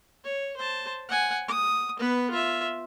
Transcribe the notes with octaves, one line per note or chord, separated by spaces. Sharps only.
C#5
C5 A5
F#5 G#5
D#6
B3 B4
F4 E5